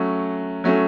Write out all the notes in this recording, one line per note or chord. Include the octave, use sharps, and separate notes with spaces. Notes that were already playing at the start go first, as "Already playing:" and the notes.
Already playing: F#3 A3 C#4
F#3 A3 C#4